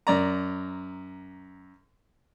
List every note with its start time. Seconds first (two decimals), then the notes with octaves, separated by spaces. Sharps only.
0.07 F#2 D5 A#5